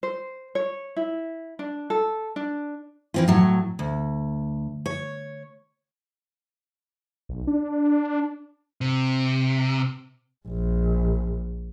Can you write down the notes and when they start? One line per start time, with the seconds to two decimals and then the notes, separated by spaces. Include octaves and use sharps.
0.03 C5
0.55 C#5
0.96 E4
1.59 D4
1.90 A4
2.36 D4
3.14 E3 C4 F4
3.28 A2 F#3
3.79 D2
4.86 C#5
7.29 B1
7.47 D4
8.81 C3
10.48 A#1